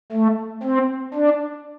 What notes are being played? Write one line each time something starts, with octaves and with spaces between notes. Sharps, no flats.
A3
C4
D4